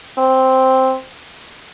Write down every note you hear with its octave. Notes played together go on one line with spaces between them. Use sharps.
C4